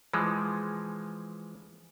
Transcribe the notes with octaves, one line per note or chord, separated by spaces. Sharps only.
E3 F3 G#3